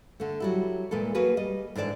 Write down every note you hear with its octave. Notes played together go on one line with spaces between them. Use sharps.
D3 A3
F#3 G3 E4
A#2 E3 G#3 A#3 A4
F#3 A#3 F#4 G#4 B4
G3 D#5
G#2 D3 E3 D5 A5